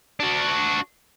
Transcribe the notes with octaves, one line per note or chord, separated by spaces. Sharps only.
D4 F#4